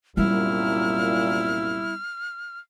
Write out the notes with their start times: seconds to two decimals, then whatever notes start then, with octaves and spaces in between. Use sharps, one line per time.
0.17 C2 F#2 A#2 G3 B3 E4 F6